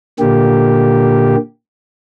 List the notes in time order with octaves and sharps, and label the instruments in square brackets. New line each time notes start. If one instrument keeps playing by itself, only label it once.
[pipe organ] A#2 D3 A#3 G4